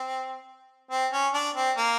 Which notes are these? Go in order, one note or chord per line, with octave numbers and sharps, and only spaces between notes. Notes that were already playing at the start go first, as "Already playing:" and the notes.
Already playing: C4
C4
C#4
D4
C4
A#3